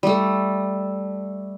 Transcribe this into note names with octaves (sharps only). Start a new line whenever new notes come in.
G3 A3